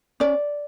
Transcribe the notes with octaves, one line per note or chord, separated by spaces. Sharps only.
C#4 D5